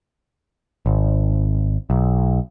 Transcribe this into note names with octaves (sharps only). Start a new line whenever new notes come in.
G#1
B1